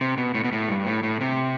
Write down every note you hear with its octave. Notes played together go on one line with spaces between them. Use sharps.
C3
B2
A2
B2
A2
G2
A2
A2
C3